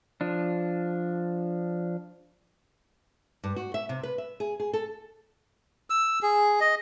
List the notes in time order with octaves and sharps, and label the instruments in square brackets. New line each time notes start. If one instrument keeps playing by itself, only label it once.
[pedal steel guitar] F3 D4
[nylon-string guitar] G2
F#4
E5
C3
B4
E5
G#4
G#4
A4
[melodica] E6
G#4
D#5